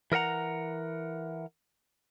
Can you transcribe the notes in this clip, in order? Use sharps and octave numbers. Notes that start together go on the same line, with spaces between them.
E3 A#4 D#5 F#5 A#5